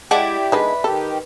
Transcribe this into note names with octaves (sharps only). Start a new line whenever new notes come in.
G#3 E4 G4 D5 F#5 A5
D#3 G#3 D4 B4
D#3 G4 A4